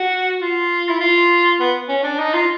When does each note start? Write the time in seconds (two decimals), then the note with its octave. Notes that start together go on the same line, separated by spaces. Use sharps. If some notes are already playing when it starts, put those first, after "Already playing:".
Already playing: F#4
0.41 F4
0.89 E4
1.00 F4
1.60 B3
1.89 C#4
2.03 D4
2.19 D#4
2.33 F4